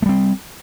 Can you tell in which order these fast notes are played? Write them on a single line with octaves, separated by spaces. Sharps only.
A3 G3 C4